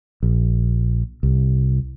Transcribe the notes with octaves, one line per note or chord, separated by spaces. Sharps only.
A#1
C2